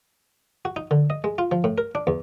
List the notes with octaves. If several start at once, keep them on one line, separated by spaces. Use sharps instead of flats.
F#4
D#4
D3
D#5
G#3
F4
F3
A2
A#4
D4
E2